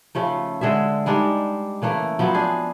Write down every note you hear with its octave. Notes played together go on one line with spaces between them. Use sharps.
C#3 F3 A3
D3 G#3 G#4 E5
G3 G#3 D4 D#4
C#3 E3 A3 A#3
F3 F#3 B3 C4
D4 G#4